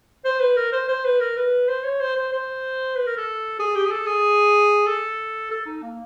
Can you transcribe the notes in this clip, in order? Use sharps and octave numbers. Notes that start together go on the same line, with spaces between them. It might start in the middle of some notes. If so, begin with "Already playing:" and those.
C5
B4
A#4
C5
C5
B4
A#4
B4
C5
C#5
C5
C5
C5
B4
A#4
A4
G#4
G4
G#4
A4
G#4
A4
A4
D#4
A#3